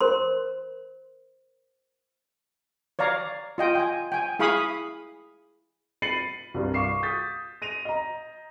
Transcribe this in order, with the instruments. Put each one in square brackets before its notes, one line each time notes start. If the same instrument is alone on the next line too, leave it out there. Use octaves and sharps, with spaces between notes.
[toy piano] A#4 C5 C6
[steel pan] C#5 D5 F5 A#5
F4 D#5 G5
G5 G#5
G5 G#5
E4 G#4 F5 B5 C#6 D#6
[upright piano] B5 A6 C7 C#7 D#7 F#7
C2 G2
F5 C#6 D6 C7 E7
D#6 G6 A6 B6
A#6 D#7 F7
D#5 A#5